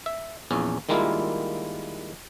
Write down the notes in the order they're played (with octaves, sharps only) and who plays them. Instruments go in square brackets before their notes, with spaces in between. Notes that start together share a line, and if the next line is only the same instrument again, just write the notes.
[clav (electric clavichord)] E5
A#1 E2 C#4
D#3 G3 G#3 A#3 E4 F4